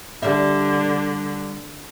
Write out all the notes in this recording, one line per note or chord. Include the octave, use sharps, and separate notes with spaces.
D3 G3 D4 E5